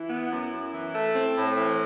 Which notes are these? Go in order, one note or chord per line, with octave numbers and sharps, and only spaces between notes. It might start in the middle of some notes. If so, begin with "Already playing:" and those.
Already playing: E3 E4
B3
F#2
F#2
E3
A3
C4
A2
E3